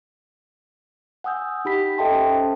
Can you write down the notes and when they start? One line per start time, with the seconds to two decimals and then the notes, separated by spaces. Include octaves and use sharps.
1.24 F#5 G#5 D#6 E6 G6
1.65 D#4 G4 B5 B6
1.98 A4 D#5 E5 G5 A5 C6
2.11 C#4 A4 C5